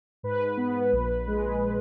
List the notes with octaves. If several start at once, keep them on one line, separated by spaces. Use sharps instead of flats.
G#2 B4
B3
A#1
G#3